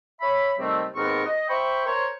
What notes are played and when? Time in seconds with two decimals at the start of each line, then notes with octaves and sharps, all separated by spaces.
0.21 C#5 E5 B5
0.59 C3 D#3 G3 A3 C4
0.96 D#2 G#2 B3 C4 A#4 C#6
1.25 D#5
1.49 C5 E5 G5 B5 C#6
1.85 A#4 C5 C#5